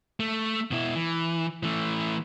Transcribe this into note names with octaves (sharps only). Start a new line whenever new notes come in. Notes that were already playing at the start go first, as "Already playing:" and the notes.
A3
B2 E4
E3
E3 A3